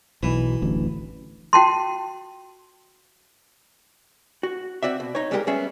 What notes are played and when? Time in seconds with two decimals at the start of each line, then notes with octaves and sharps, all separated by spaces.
0.23 B1 B2 E3
0.62 D1 A1 D2
1.53 F#4 G5 A5 C6
4.43 F#4
4.83 C4 F#4 D5 E5
5.00 B2
5.15 D#4 C#5
5.31 G3 G#3 E4 F4 G4 A#4
5.47 G3 B3 C#4 G#4 E5